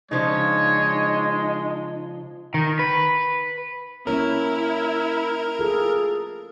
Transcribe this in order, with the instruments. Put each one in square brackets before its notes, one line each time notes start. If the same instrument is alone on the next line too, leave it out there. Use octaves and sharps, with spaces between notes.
[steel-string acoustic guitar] C#3 F3 D4 [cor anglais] G#3 [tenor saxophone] D#4 [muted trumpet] C#5
[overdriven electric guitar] D#3
B4
[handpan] A#3 C#4 C#5 [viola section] E4 [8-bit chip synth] A#4
[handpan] F4 A4 [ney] G#4